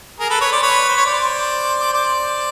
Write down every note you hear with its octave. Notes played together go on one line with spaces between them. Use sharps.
G#4 A#4
A4 B4
B4 C#5
C5 D5
B4 C#5
C5
C#5
C5 D5
C5 D5